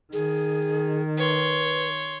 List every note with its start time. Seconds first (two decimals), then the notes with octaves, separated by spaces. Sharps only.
0.13 D#3 G#4
1.18 B4 C#5 C6